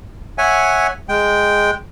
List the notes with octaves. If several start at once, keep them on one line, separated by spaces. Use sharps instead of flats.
C#5 E5 F#5 G#5
G#3 G5